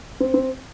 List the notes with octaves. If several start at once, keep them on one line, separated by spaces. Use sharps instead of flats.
C4
C4